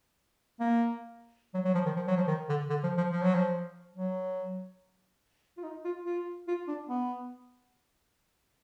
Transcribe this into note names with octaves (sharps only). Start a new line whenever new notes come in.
A#3
F#3
F#3
F3
D#3
F3
F#3
F3
D#3
D3
D3
F3
F3
F3
F#3
F3
F#3
F4
D#4
F4
F4
F4
D4
B3